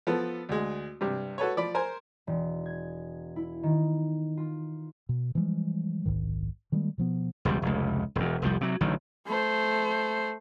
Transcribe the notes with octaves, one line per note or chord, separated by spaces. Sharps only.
F3 B3 A4 B4
D2 G#3
G2 C3
F#4 A4 B4 C#5
F3 D5 B5
A#4 C5 G#5
E1
G#6
E4
D#3
F4
B2
E3 F3 G3 G#3
D1 A#1 G#2 D#3
D#3 G3 G#3 A#3
B2 F3 B3
E1 C#2 G3
F1 C#2
E1 E2
F1 C2 F3 G3
C3 F#3
A1 D3 D#3 F#3
A3 C5